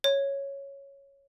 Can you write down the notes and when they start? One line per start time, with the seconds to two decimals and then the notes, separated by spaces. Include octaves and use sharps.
0.04 C#5